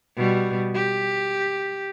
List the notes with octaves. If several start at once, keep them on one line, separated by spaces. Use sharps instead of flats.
B2 G3
G4